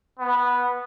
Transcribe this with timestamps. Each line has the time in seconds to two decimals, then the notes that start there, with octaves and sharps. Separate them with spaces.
0.19 B3